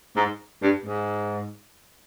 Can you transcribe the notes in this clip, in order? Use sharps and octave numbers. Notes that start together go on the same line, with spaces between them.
G#2
G2
G#2